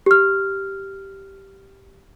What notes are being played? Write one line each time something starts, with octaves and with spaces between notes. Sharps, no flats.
G4 F6